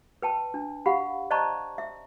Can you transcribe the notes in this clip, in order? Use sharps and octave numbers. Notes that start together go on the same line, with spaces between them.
B4 G5 A5
D4
G4 F5 F#5 B5
C5 D5 D#5 A5 A#5 C#6
E5